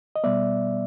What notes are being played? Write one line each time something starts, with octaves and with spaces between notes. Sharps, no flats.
D#5
B2 G3 B3 D5 E5